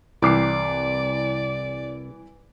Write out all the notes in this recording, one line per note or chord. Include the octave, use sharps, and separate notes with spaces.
C2 E3 D5 D6 C7